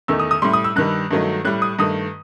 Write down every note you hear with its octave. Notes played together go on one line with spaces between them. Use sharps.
E2 D#3 A3 E6
D#6
D#6
A2 G3 C6
D#6
E6
G2 D#3 G3 F#6
G2 D#3 F#3 A3
A2 G3 F#6
D#6
G2 D#3 A3 D#6